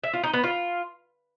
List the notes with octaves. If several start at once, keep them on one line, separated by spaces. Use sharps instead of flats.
E5
F4
D#4
B3
F4